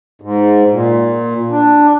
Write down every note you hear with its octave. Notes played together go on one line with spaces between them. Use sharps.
G#2
A#2
D4